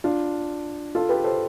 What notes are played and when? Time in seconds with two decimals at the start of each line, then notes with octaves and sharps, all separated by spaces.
0.04 D4 F4
0.95 F4 A4
1.09 G4 B4
1.24 A4 C5